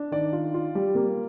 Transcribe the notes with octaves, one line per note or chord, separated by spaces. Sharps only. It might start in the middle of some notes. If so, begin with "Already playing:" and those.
Already playing: D4
D#3 D5
F4
F4
G3
A#3